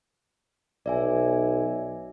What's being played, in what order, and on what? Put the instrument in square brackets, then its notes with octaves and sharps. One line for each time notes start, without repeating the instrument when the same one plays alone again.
[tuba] B1 [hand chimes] D5 E5 G#5